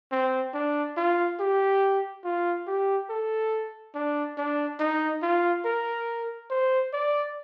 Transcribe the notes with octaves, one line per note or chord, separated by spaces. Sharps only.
C4
D4
F4
G4
F4
G4
A4
D4
D4
D#4
F4
A#4
C5
D5